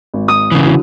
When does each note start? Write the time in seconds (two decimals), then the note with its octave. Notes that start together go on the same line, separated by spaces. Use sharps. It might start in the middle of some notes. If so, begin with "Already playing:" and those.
0.14 G#1
0.28 D#6
0.52 C#3 E3
0.64 D3 F#3 E4